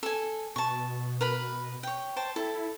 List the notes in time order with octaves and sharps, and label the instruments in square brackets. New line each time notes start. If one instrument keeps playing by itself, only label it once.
[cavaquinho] A4 G#5
[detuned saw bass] B2 [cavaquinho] A5 C#6
[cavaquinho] A#4 B4 B5
C#5 G5
C5 G5 A5
[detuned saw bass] E4 [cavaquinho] A4